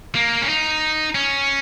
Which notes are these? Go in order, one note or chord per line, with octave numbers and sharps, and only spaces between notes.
A#3
C#4
D#4
C#4